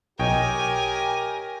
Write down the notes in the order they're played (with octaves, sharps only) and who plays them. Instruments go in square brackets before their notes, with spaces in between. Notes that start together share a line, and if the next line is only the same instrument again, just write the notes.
[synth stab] B1 [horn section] G4 A#4 [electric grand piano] C#5 D#5 G5 [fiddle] G#5